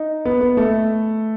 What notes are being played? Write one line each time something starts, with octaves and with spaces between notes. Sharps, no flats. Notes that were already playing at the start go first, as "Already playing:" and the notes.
Already playing: D#4
B3
B3
A3